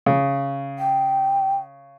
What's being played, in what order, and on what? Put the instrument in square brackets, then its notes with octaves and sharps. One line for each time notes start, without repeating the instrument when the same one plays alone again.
[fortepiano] C#3
[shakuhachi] G5